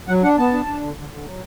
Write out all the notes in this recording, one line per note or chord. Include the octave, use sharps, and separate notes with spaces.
F#3 F#5
D4 F#5
B3 A5
D4
D4
D3
D3
D3
F#3